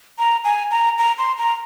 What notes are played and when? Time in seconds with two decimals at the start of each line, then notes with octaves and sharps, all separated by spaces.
0.19 A#5
0.44 G#5
0.71 A#5
0.98 A#5
1.18 C6
1.38 A#5